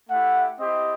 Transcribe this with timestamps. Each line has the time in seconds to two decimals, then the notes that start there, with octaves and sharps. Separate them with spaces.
0.09 A3 E4 G4 F#5
0.58 C4 E4 G4 D#5